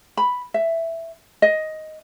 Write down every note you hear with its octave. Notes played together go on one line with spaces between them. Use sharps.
B5
E5
D#5